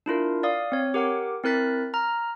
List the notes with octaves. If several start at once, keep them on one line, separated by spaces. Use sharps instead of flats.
D4 E4 F4 A#4
D5 F5 D#6
C4 C#5
G4 A#4 F#5 D6
C4 E4 A#4 F#6 A6 B6
A#5 F6